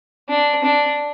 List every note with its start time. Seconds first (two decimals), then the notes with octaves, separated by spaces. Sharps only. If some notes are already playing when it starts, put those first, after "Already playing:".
0.29 D4
0.64 D4